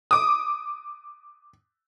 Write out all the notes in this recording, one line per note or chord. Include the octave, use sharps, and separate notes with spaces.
D6 D#6